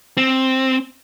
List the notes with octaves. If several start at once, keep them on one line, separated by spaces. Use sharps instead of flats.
C4